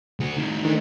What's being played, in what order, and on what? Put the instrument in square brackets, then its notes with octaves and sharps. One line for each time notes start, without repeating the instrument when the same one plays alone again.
[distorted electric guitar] D2 F#4
A2 D#3
[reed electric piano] D#3 [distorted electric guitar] A3 D4